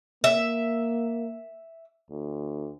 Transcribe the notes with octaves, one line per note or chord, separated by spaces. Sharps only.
A#3 E5
D2